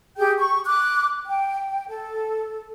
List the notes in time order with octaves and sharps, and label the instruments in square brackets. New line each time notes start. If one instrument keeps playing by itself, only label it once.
[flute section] G4 G#4 G5 G6
C#6
D6 F#6
G5
A4